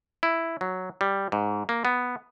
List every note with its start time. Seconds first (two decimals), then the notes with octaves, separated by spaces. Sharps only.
0.23 E4
0.61 F#3
1.01 G3
1.32 G#2
1.69 A#3
1.85 B3